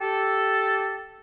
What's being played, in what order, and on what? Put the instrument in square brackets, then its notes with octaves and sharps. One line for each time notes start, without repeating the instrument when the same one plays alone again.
[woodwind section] G4 A4